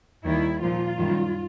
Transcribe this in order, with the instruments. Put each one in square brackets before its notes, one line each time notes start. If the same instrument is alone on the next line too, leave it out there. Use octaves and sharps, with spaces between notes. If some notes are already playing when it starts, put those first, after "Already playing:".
[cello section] D#2 D#3 G3 E4
A#2 F3 F4
F#2 D#3 G3